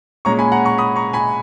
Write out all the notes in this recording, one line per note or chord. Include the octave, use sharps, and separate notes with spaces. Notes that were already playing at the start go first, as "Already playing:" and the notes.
A#2 G#3 C#4 A#5 C#6
G#5 B5
F#5 A#5
A#5 C#6
B5 D#6
A#5 C#6
G#5 B5